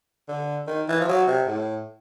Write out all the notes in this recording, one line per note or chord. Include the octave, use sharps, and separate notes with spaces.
D3
D#3
E3
F3
F#3
C3
A2